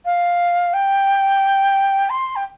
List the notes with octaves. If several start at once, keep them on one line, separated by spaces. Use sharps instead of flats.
F5
G5
C6
G5